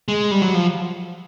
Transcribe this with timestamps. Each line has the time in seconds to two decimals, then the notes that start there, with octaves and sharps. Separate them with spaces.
0.08 G#3
0.31 G3
0.42 F#3
0.55 F3